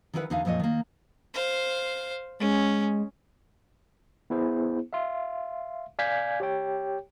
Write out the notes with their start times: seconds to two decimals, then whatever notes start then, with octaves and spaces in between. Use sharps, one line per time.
0.14 D#3 E3 E4 A4 B4 F#5
0.30 E2 D3 D#4 G#4 E5 F5
0.45 F2 A#2 F3 C#5 D#5
0.60 D#3 A#3
1.34 C5 F5
2.40 G#3 C#4
4.30 B3 E4 G#4 C5
4.93 E5 F5 C6
5.99 D5 F5 G#5 G6 G#6 B6
6.40 G4 C#5 G5